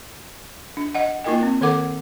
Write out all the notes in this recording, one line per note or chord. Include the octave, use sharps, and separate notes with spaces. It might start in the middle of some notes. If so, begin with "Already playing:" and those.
D4
D#5 F#5
A#3 D#4 F4 A#4 D#5 G5
C4
D#3 A4 A#4 F#5 D6